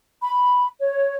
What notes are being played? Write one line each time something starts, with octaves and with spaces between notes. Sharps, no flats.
B5
C#5